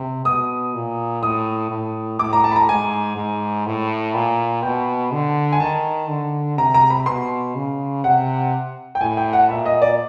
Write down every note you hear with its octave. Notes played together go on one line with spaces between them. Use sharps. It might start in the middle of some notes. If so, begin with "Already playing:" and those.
Already playing: C3
B2 D#6
A#2
A2 D#6
A2
A2 D6
A#5
A5
B5
A#5
G#2 G#5
G#2
A2
A#2
B2 G5
D3
G#5
D#3 A5
D3
C3 A#5
A#5
B5
B2 C6
C#3
C3 F#5
G5
A2 G#5
G5
F#5
A#2 E5
D#5
D5